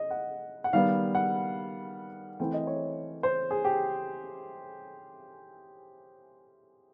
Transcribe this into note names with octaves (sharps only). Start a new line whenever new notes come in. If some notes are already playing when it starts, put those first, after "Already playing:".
Already playing: D#5
F#5
F#5
D#3 G3 B3 F5
F#5
E3 A3 C4 G5
D#5
C#5
C5
G#4
G4